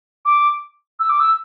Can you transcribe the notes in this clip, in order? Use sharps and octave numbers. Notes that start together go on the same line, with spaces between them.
D6
E6
D6
E6